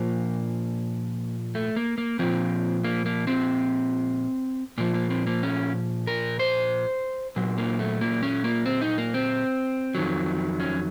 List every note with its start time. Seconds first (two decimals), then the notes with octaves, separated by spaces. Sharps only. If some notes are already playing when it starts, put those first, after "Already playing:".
Already playing: A#2 F3 A#3
1.55 A3
1.76 A#3
1.98 A#3
2.19 A#2 F3 C4
2.84 A#3
3.06 A#3
3.27 C4
4.78 A#2 F3 A#3
4.94 A#3
5.10 C4
5.27 A#3
5.43 C#4
6.07 A#4
6.39 C5
7.36 A#2 F#3
7.58 A#3
7.79 A3
8.01 A#3
8.23 C#4
8.44 A#3
8.66 C4
8.81 D#4
8.98 A#3
9.14 C4
9.95 F2 D#3 F#3
10.60 C#4